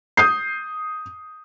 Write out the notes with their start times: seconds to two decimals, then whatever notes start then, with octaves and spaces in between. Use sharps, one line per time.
0.17 D#6 G6 C7